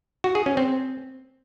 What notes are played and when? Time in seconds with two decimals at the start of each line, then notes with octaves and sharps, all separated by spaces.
0.24 F#4
0.35 G#4
0.46 C#4
0.57 C4